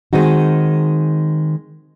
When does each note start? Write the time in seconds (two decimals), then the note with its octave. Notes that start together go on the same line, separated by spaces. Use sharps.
0.13 D#3 G#3 C4 D#4 F#4